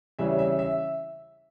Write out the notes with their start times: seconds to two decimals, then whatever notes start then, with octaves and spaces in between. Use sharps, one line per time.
0.19 C#3 E3 G3 C#4 E5
0.39 E5
0.59 E5